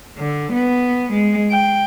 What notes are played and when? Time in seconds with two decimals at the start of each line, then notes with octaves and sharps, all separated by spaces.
0.18 D3
0.52 B3
1.12 G#3
1.51 G5